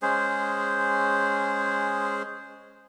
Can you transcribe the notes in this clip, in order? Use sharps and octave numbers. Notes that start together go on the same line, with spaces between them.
G#3 C#4 G#4 C5